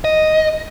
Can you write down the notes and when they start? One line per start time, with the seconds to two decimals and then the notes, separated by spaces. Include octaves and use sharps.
0.04 D#5